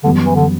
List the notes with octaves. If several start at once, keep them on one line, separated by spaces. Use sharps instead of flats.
F#2 D3 E3 G3 B3
E3
D3